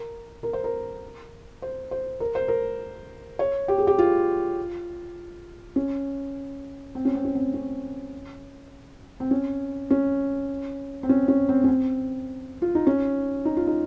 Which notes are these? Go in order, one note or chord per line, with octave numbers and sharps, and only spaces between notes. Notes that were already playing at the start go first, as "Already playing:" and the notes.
Already playing: A#4
A#4
C5
A#4
C5
C5
A#4
C5
A#4
C#5
G4
G#4
G4
F4
C#4
C4
C#4
C4
C#4
C4
C#4
C4
C#4
C#4
C4
C#4
C#4
C4
C#4
C4
F4
D#4
C#4
D#4
F4
D#4